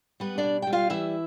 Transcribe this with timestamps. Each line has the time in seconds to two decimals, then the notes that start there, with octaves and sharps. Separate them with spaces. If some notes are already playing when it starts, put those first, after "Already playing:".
0.20 G3 B3 B4
0.38 D4 D5
0.43 B2
0.62 G3 G5
0.73 F4 F5
0.90 E3 E4 E5